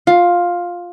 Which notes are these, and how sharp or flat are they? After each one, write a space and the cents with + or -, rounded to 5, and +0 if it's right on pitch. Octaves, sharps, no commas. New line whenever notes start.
F4 +10